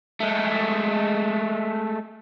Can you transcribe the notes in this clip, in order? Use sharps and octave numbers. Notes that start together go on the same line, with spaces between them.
G#3 A3